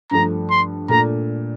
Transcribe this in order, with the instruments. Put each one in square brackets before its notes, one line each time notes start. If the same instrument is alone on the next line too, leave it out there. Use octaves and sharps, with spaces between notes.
[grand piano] G2 F3 A3 [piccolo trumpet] A#5
[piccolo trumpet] C6
[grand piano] A#2 A3 D4 [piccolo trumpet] A#5